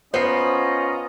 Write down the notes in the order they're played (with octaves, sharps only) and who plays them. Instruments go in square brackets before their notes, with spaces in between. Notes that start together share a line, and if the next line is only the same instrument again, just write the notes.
[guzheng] B3 [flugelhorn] C#4 [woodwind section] F4 D#5 A#5 [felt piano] C5 C7